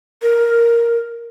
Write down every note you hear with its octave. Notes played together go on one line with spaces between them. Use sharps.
A#4